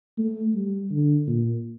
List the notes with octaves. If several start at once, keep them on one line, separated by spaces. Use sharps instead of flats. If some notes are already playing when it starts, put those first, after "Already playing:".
A3
G3
D3
A#2